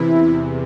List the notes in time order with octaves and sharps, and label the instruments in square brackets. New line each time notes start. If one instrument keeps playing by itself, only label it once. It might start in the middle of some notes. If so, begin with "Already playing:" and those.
Already playing: [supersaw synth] E2 C3 E3 E4